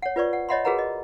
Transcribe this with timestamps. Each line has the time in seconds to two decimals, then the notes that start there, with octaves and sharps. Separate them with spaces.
0.02 C#5 F#5
0.16 F4 B4 C5 D5 C#6
0.33 F#5
0.49 C#5 D#5 E5 F#5 B5 C6
0.65 F#4 G#4 A#4 B4 F#5 A#5
0.79 D#5